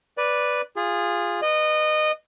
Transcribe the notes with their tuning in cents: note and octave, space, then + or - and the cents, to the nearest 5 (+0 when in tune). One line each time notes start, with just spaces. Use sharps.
B4 +0 D5 +0
F4 +0 G#4 -20
B4 +0 D#5 -20